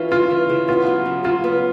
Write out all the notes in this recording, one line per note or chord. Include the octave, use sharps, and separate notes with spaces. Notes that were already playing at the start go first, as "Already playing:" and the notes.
Already playing: E3 C#4 F4
C#3 F4
E3
C#3
B3 F4
F#3
C#3
C#3 F4
B3